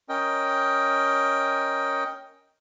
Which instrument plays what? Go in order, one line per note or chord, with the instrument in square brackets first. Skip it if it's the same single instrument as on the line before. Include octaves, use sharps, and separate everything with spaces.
[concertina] C#4 A#4 D#5 G5